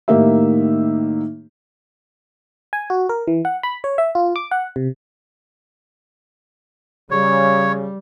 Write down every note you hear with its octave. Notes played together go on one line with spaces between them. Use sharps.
A2 D#3 A#3 D#4 G4 E5
G#5
F#4
A#4
E3
F#5
B5
C#5
E5
F4
D6
F#5
C3
C#3 G3 C#5